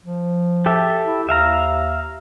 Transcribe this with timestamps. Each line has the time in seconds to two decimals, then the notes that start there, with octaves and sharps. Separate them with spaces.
0.06 F3
0.66 G4 A4 E5
1.05 E4
1.29 D#2 E5 F5 A#5